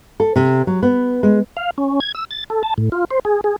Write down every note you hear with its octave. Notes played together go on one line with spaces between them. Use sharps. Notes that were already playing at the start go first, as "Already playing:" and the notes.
A4
C3
F#3
B3
G#3
F5
C#4
G#6
E6
A6
A4
A5
A2
F4
C5
G#4
G#4